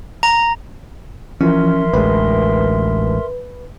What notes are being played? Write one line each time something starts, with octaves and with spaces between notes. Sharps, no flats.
A#5
E3 F3 C#4 A#4 E5 C6
A1 D2 G#3 B4